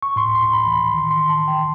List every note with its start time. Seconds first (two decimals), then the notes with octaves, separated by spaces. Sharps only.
0.02 C#6
0.16 A2 C6
0.35 C6
0.42 A2
0.53 B5
0.67 E3
0.73 B5
0.91 D#3 C6
1.11 C6
1.17 D#3
1.29 A5
1.42 D#3
1.48 G5